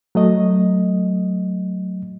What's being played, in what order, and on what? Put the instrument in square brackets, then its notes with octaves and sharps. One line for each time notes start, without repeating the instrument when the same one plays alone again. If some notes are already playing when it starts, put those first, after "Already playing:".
[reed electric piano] F#3 A3 D#5